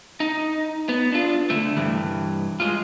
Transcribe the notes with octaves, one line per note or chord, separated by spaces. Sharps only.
D#4
B3
D4 F4
D3 A3
G2 E3
G#3 F4